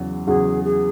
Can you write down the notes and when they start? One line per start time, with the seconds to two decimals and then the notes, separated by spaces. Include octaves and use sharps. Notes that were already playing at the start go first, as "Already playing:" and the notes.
Already playing: E2 C#3 F#3
0.27 E2 C#3 F#3 G#4
0.64 G#4